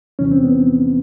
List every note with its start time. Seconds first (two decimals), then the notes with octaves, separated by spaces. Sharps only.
0.19 E2 C3 E3 C#4
0.31 C4
0.44 B3